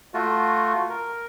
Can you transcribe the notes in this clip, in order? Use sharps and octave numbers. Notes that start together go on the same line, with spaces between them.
A3 F4 F#4
A#4